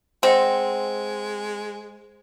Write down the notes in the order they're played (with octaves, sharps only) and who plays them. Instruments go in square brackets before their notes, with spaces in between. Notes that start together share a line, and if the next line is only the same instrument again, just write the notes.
[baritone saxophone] G#3 [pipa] C4 [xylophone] C5 D#5 F#5